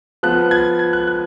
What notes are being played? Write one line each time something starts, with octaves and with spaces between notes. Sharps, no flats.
F3 B3 F#6
G#6
G#6
F#6
F#6